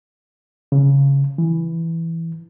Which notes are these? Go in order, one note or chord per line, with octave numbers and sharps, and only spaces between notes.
C#3
E3